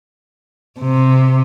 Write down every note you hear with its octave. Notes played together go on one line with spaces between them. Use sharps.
C3